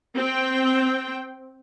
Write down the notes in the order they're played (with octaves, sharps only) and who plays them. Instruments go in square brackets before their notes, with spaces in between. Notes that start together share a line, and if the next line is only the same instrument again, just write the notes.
[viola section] C4 G5